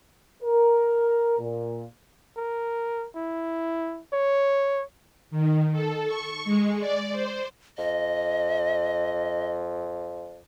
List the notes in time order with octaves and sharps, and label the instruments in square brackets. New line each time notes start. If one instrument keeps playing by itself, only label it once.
[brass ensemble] A#4
A#2
[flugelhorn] A#4
E4
C#5
[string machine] D#3
A4
C#6
G#3
D5
C5
[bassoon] F2 [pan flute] D#5